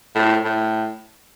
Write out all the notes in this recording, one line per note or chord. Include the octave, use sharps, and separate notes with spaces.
A2
A2